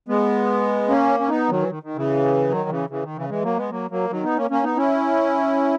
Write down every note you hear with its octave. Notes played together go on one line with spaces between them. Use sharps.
G#3 B3
A#3 C#4
C#4
B3 D#4
D#3 F#3
E3
D#3
D#3
C#3 E3
D#3 F#3
C#3 E3
C#3 E3
D#3
C#3 E3
E3 G#3
F#3 A#3
G#3 B3
F#3 A#3
F#3 A#3
D#3 F#3
B3 D#4
A#3 C#4
A#3 C#4
B3 D#4
C#4 E4